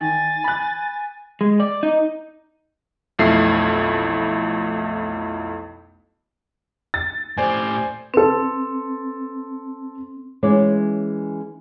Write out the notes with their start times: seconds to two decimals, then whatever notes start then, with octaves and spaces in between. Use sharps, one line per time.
0.01 D#3 G#5 A6
0.44 B5 F#6
1.41 G#3
1.60 D5
1.83 D#4
3.19 B1 F2 A3 E4 C7
6.94 A6
7.38 A2 G4 C5 D5 G#5
8.14 C4 A4 B4
10.43 E3 G#3 C#4 C#5 D5